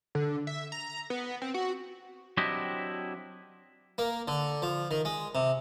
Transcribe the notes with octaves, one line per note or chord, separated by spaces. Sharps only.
D3
E5
A#5
B3
C4
F#4
F#3 C4 D4 E4 G4 D#5
A#3
D3
F3
D#3
G#3
C3